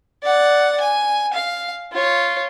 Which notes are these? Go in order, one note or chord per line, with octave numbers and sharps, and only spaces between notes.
D5 F#5
G#5
F5
F4 C#5